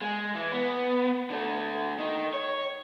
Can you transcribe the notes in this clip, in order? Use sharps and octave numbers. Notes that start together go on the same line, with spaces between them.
G#3
E3
B3
D3 A3
D#3
C#5